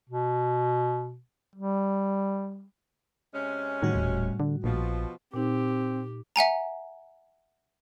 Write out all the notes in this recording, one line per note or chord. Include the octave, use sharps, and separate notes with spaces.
B2
G3
C3 G#3 C#4
A2 D#3 G3 F#4
D#1
D3
A#1 B2 F3
A#2 C4 D#4 G4
E5 F#5 G#5 A#5